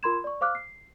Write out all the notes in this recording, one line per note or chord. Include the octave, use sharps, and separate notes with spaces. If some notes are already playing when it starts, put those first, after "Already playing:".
F4 A#4 B5 C6 G#6 E7
D5 C#6
C5 F5 D6 F6 F#6
C7